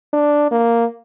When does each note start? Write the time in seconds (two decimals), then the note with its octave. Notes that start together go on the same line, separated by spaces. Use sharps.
0.13 D4
0.51 A#3